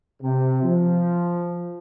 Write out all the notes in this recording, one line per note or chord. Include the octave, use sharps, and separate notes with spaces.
C3
F3